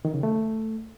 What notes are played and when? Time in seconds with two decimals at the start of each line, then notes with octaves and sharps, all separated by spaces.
0.05 D#3
0.14 C#3
0.23 A3